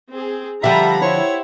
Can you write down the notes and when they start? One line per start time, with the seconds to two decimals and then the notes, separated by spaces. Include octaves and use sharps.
0.11 C4 G#4
0.64 D3 F3 G3 G4 E5 F#5 A#5 B5
1.02 E4 C5 C#5